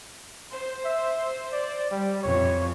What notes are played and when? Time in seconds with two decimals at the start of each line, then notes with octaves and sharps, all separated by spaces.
0.52 C5
0.85 E5
1.53 D5
1.91 G3
2.23 F2 C3 E3 C#5